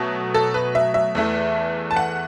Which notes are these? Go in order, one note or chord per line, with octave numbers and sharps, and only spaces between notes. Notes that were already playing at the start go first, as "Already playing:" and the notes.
Already playing: B2 F#3 A3
A4
B4
E5
E5
E2 E3 A3
A5
F#5